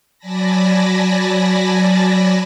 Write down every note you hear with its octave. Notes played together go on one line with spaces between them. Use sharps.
F#3 D5 G#5 A5 B5 A#6